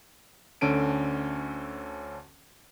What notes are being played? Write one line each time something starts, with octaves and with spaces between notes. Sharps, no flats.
D2 D3 C#4 A4 D7 D#7